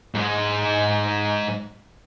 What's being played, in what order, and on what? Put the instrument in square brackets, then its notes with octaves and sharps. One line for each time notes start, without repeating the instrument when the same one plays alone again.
[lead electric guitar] G#2 G#3